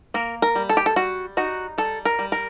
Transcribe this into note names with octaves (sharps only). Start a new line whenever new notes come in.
A#3 A#4
A#4
G3
A4
G4
A4
G3 F#4
D#4 F#4
G3 A4
A#4
G3
A#4